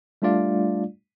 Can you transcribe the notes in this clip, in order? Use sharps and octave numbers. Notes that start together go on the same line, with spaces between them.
G3 A3 D4 F4 D5 F5